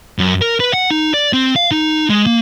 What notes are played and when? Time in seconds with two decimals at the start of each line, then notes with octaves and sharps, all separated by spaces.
0.18 F#2
0.41 A#4
0.60 B4
0.73 F#5
0.90 D#4
1.14 D5
1.33 C4
1.56 F5
1.71 D#4
2.10 G#3
2.26 A#3